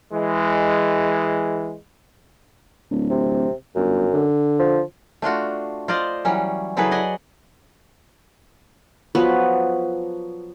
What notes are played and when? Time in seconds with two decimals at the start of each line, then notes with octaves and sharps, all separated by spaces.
0.12 E3 G#3
2.91 D1
3.10 C3
3.76 G1 F#2
4.14 D3
4.59 F3
5.22 A3 D4 F4 F#4
5.88 F4 C5 D5 D#5 F5
6.25 E3 F#3 G3 C#4
6.77 C#3 F#3 E4 G#4 A4 B4
6.91 D5 D#5 F#5 G#5
9.15 F3 F#3 B3 B4